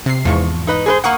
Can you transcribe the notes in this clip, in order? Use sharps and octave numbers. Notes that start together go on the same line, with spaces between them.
C3 C7
E2 G#2 F3 C#6
D#4 B4 D#5
G#4 B4 C5
A#3 F#5 C#6 D#6 F#6